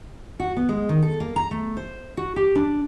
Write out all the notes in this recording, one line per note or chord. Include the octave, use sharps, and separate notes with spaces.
F#4
B3
G#3
D#3
A4
A#3
A#5
A3
C5
F#4
G4
D4